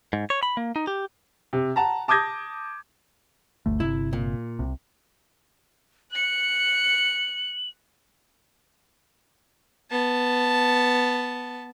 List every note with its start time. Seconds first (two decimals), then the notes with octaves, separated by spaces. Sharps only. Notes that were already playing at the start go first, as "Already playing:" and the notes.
0.13 G#2
0.30 C#5
0.43 B5
0.57 A#3
0.76 D#4
0.87 G4
1.53 C3
1.76 F#5 A5 A#5
2.08 A5 D6 D#6 G6 G#6 A#6
3.66 G1 D2 A3
3.80 G1 C3 E4
4.13 A#2
4.59 C2 C3
6.13 F#6 C#7 F#7
9.91 B3 A5